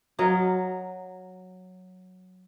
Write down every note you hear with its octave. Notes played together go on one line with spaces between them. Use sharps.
F#3 A#4 D#5 F5